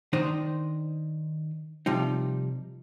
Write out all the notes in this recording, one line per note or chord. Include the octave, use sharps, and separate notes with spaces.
D#3 D4 D#4 C5 D#5 C6
C3 F3 G3 D#4